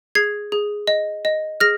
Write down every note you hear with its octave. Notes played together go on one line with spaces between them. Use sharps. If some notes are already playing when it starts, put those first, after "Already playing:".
G#4 G#6 C7
G#4
D#5
D#5
G#4 F6 A#6